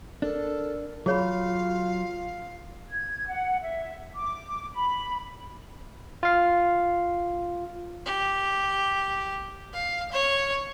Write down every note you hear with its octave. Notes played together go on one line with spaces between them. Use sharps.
D4 A4 A#4
F#3 F4 G#4 C#5 F5 B5
G#6
F#5
E5
D6
B5
F4 F5
G4
F5
C#5